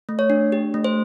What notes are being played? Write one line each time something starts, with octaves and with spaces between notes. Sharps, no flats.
A3
C#5
D4
G4
A3
C5